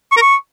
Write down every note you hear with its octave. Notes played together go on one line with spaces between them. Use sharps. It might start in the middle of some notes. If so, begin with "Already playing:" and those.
C#6
A#4
C#6